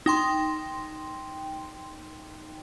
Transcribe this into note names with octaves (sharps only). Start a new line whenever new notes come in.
D#4 G5 C6